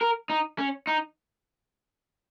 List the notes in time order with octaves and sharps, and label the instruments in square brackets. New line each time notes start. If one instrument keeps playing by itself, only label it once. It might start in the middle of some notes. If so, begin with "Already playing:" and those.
[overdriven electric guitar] A#4
D#4
C#4
D#4